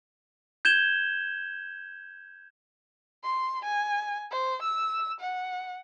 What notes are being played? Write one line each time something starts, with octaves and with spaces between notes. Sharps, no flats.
G6 G#6 E7 G7
C6
G#5
C5
E6
F#5